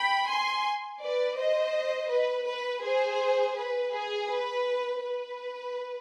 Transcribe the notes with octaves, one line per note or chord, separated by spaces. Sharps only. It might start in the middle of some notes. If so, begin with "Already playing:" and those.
Already playing: G5 B5
G#5 C6
B4 D5
C5 D#5
B4
B4
G#4 C5
B4
G#4
B4
B4